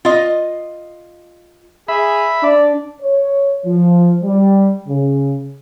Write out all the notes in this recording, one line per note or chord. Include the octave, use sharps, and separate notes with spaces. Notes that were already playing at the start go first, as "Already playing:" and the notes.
F4 D#5
G#4 E5 B5
D4 D5
C#5
F3
G3
C#3